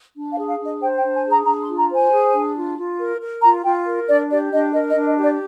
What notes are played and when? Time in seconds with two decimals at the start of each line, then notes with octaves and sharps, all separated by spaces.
0.14 D4
0.32 F5
0.37 G#4
0.48 F5
0.59 D4
0.64 D#5
0.80 C5 G5
0.97 G5
1.02 D4
1.14 G#5
1.25 G#4 A#5
1.46 D4 A#5
1.63 C6
1.68 F4
1.79 A#5
1.90 C5 G#5
2.11 G#4
2.33 D4
2.56 F4
2.77 F4
2.98 A#4
3.21 A#4
3.42 F4 A#5
3.64 F4 G5
3.86 A#4
4.08 D4 D5
4.30 G4 D5
4.52 D4 D#5
4.73 A#4 D#5
4.89 D#5
4.95 D4
5.07 D#5
5.17 G4
5.23 D5